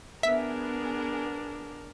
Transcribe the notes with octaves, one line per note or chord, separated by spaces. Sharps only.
B3 D4 G#4 A#4 E5 B6